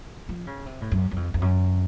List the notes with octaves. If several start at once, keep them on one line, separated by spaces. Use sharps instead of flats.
F3
C#3
C3
A2
F#2
F#2
F2
F2
F#2